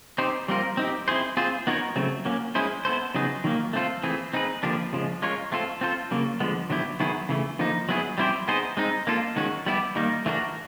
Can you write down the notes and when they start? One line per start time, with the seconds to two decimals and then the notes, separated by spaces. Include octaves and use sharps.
0.18 C4 D#4 G4 C5
0.48 G3 C4 F4 A#4
0.77 C4 D#4 G4
1.08 C4 E4 G#4 C5
1.37 C4 F4 G#4 C5
1.67 B3 D#4 F#4 A#4 C#5
1.96 C#3 F#3 A3 C4
2.25 F#3 A#3 C#4
2.55 G#3 C#4 E4 G#4 C5
2.85 B3 E4 A4 C5
3.15 C#3 F#3 B3 D#4 G#4
3.44 D#3 F#3 A#3
3.73 A3 C4 F4 A4
4.03 E3 A3 C4 E4 G#4
4.33 C4 D#4 G#4 B4
4.63 D3 F3 A#3 D4 G4
4.93 C#3 F3 G#3
5.22 G#3 C#4 F4 A#4 C#5
5.52 A3 C4 F4 A4
5.81 C4 F4 A4 C5
6.11 C#3 F#3 A#3
6.40 D3 F3 G#3 B3
6.70 D3 F#3 B3 E4 G4
7.00 D#3 F#3 B3 E4 G#4
7.29 C#3 E3 A3
7.59 D3 F3 A#3 D#4
7.89 F#3 B3 E4 G#4
8.18 G3 C4 E4 G4 C5
8.48 B3 D#4 G#4 C5
8.77 G#3 C4 D#4
9.07 A#3 D4 F4 A4
9.36 D#3 G#3 C#4 F#4
9.66 G3 B3 E4 G4
9.96 D#3 G3 A#3 D#4
10.26 E3 A3 D4 F#4 A#4